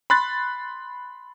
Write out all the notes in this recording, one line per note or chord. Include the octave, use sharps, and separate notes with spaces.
B5 C6 F#6 A6